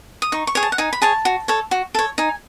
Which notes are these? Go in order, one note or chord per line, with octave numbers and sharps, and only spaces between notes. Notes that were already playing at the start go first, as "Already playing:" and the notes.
D#6
D#4 C#6
C#6
G#4 C#5
A5
F#5
D#4 G#5
B5
G#4 C#5 A5
F#4
A4 C#5
F#4
A4 C#5
D#4 G#5